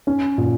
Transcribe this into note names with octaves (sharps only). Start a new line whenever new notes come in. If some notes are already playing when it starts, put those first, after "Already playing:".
C#4
A#2